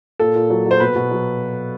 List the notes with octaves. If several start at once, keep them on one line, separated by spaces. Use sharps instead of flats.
A#2 A4
A#2
F#3
F#3
C5
B2 B4
B2
F#3